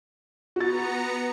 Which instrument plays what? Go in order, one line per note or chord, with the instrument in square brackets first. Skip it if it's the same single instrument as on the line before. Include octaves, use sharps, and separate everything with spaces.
[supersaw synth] B3 A#5 C#7 [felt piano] F#4 A6